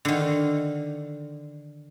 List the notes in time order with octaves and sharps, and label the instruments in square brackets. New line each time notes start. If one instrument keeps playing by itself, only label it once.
[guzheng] D3 D#3